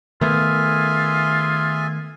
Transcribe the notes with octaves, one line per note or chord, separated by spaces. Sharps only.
D#3 A3 B3 F4 G#4 E5 G#5